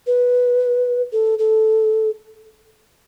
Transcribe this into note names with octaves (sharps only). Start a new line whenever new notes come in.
B4
A4
A4